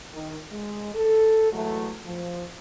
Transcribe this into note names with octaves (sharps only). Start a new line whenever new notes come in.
D#3
G#3
A4
E3 F#3 G#3 A3
F3